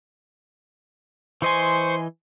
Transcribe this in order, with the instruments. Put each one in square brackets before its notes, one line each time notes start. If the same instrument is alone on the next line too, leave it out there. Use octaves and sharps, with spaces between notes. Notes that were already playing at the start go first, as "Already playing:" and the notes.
[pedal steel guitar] E3 D#5 G#5 [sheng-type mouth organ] C5 C#6 [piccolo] C6